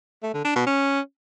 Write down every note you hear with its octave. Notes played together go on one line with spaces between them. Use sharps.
A3
D3
D4
B2
C#4